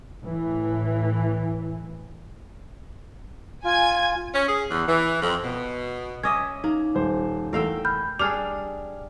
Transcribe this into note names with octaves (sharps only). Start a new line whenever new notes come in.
A2 E3
F4 G#5 G#6
C#4
G#4
E2
E3
F2
B2
C#4 D#5 E5 D6 D#6 G#6
A#3 D#4
D#1 C5
E2 A3 A#4 F5 G5 E6
B5 F6 G6
G3 D4 G#4 D6 F6 F7